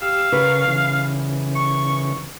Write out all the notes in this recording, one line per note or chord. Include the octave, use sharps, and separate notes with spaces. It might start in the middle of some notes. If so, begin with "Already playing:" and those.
G4 F5 E6
C#3 A#4 B4 C#6
C#3 E3
C#6